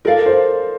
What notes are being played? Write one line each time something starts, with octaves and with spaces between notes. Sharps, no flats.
A4 A#4 D5 F5
C5